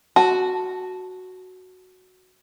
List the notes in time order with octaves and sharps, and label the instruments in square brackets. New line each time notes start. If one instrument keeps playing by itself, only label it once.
[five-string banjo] F#4 [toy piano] A5